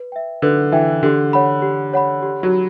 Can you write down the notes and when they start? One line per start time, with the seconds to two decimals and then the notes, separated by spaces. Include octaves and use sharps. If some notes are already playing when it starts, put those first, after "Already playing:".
Already playing: B4
0.12 E5 G5
0.42 D3 B4
0.72 E3 E5 G5
1.03 D3 G4
1.33 C#5 F#5 B5
1.62 G4
1.93 C#5 F#5 B5
2.22 G4
2.43 F#3
2.53 B5